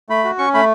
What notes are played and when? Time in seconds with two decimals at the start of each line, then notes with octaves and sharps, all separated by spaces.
0.09 A3 B5
0.24 F#4
0.39 C#4 C#6
0.54 A3 B5